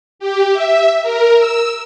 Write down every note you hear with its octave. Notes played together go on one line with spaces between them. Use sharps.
G4
E5
A#4
E6